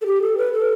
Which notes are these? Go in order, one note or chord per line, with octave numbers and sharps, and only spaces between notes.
A4
G4
A4
B4
A4